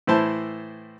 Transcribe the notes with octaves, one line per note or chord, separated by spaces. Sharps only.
A2 E3 E4 C5 A5